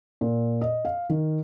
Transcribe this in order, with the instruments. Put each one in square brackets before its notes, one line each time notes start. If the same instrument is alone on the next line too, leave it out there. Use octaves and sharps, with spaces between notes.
[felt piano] A#2
D#5
F5
D#3